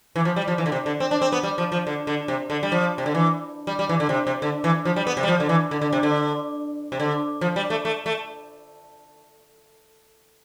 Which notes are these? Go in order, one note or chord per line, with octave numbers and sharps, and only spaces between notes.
E3
F3
G3
F3
E3
D3
C3
D3
C4
D4
C4
B3
G3
F3
F3
D3
D3
C3
D3
G3
F3
C3
D3
E3
G3
G3
E3
D3
C3
C3
D3
E3
F3
G3
B3
C3
G3
F3
D3
E3
D3
D3
C3
D3
C3
D3
F3
G3
A3
A3
A3